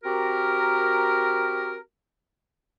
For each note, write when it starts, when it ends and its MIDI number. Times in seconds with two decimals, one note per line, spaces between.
0.04 1.78 60
0.04 1.78 66
0.04 1.78 67
0.04 1.78 70